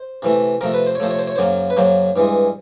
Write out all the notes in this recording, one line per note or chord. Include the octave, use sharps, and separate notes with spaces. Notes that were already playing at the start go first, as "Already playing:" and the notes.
Already playing: C5
C3 E3 A3
C3 F3 A3 A#4
B4
C5
C#5
C3 F3 A3 C5
C#5
C5
C#5
F#2 C#3 F#3 A#3 C5
B4
F#2 C#3 F#3 A#3 C5
G2 E3 G#3